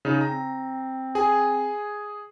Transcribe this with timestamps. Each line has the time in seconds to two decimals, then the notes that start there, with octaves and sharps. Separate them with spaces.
0.05 C#3 D#4
0.21 C4 A#5
1.15 G#4 G#5